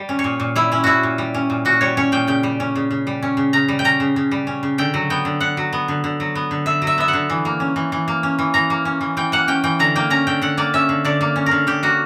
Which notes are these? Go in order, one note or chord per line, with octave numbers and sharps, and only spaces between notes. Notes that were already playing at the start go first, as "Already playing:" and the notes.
Already playing: G3
C#4
C#5
A#2
A#2
G3 E4
C#4 E4
A#2 E4 F#4
A#2
G3
C#4
A#2
A#2 F#4
G3 C#5
C#4 C#5
A#2 G5
C#3 G5
G3
C#4
C#3
C#3
G3
C#4
C#3
C#3 A#5
G3
G5
C#4 A#5
C#3
C#3
G3
C#4
C#3
D3 G5
F#3
B3 G5
D3
D3 F#5
F#3
B3
D3
D3
F#3
B3
D3
D3 E5
F#3
E5
B3 E5
F#5
D3
E3
A#3
C#4
E3
E3
A#3
C#4
E3
E3 A#5
A#3
C#4
E3
E3 G5
A#3 F#5
C#4 G5
E3 G5
D3 A#5
A#3 G5
C#4 A#5
D3 G5
D3 F#5
A#3 D5
C#4 E5
D3
D3 D5
A#3
C#4
A#4
D3
D3 G4
A#3 F#4